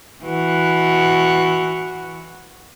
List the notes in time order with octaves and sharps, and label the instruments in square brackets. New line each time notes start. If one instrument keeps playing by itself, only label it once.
[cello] E3 F#4